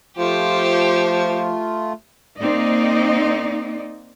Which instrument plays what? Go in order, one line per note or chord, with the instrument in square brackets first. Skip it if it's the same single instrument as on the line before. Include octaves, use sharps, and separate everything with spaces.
[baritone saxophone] F3 [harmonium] A3 F4 [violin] G4 C5
[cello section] A#3 C4 D#4 D5 D#5